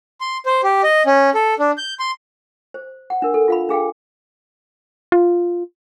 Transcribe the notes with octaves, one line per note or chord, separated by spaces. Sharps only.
C6
C5
G4
D#5
C#4
A4
D4
G6
C6
C5
F#5
D4 A#4
A4
F4 F5 B5
D4 G#4 F5 G5
F4